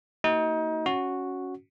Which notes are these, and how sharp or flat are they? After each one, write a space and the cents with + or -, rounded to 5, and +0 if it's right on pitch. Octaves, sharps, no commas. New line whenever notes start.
A#3 -40 D#4 +30 F#4 +40
C#4 +0 F#4 -5